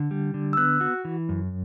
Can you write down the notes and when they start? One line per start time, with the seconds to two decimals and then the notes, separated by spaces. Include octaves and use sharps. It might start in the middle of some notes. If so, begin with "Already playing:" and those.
Already playing: D3
0.11 G3
0.34 D3
0.53 E6
0.57 B3 F#6
0.81 F#4
1.05 E3
1.29 F#2